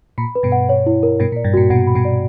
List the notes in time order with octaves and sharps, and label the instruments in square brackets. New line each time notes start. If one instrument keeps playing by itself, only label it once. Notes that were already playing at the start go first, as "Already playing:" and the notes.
[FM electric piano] A#2 [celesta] B5
[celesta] B4
[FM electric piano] G2 B2
[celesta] F#5
C#5
E4
A#4
[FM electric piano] G2 B2 [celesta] A#4
[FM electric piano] A#2
[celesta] D5
[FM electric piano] G2
[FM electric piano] A#2 [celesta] F#4
[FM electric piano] G2 B2 [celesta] F#5
[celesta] B5
[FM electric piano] G2 B2
[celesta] D5